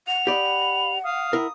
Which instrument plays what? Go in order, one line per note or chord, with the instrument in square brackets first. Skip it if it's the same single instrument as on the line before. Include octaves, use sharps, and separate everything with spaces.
[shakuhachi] F#5 [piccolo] F7
[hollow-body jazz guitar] G4 D5 D#5 [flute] B5
[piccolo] F5 [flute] D#6
[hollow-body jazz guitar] E4 A#4